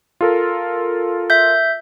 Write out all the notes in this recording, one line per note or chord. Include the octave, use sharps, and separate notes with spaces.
F4 A4 A#4
E5 G6